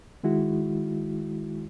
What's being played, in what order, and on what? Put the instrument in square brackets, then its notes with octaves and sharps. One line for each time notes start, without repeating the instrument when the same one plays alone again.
[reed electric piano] D#3 G#3 E4 F#4